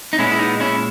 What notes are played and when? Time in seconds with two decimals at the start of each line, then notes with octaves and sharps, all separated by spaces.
0.13 D#4
0.19 A#2 G#3 B3 C#4 E4
0.31 E4
0.39 B3 D#4
0.60 C#4 E4